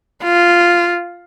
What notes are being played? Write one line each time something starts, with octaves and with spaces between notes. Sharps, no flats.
F4